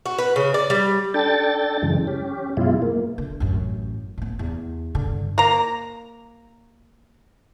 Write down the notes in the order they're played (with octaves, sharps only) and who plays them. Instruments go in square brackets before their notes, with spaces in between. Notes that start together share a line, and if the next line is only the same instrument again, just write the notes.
[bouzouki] F#4
B4
C#3
D5
G3
[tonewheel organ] D4 A4 G5 A6
F#2 C#3 E3 G#3
C#4 G4
F#2 B2 G#3 E4 F4
A#3
[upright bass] D3
A1 F#2
A2 B3
E2
G2 D3
[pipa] A#3 A#5